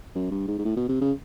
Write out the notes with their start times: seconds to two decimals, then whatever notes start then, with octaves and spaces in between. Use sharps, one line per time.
0.15 F#2
0.31 G2
0.48 G#2
0.59 G#2
0.65 A2
0.77 B2
0.89 C3
1.01 C#3